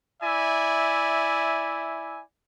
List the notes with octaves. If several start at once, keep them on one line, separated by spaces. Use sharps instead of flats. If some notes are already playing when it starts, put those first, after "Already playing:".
E4 D5 E5 G#5